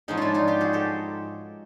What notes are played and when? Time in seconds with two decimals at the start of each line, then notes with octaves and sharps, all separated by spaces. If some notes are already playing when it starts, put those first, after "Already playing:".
0.08 G#2 F3 C#4 D#4
0.17 D4 E4 F4
0.34 D#4 F4
0.47 F4 G4
0.61 F#4 G#4
0.73 G4 A4